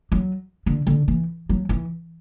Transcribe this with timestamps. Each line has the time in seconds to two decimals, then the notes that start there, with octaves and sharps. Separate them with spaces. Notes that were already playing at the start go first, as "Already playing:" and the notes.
0.12 F#3
0.66 D3
0.87 D3
1.08 E3
1.49 F#3
1.69 E3